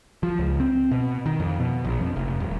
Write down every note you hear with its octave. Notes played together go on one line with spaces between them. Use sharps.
F3
C#2
C4
B2
D#3
F2
B2
A#1
F2
F1
D#1